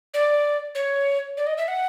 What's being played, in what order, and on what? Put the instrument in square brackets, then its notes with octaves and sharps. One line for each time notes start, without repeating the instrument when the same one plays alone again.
[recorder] D5
C#5
D5
D#5
E5
F#5